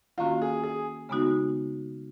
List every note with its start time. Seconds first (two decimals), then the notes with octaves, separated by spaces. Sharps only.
0.18 D#3 A#3 C#4 F4 F#4
0.42 G#4
0.63 G#4
1.09 C#3 G#3 B3 D#4 F#4